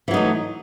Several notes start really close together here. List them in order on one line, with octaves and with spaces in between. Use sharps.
E3 F#3 D#4 A3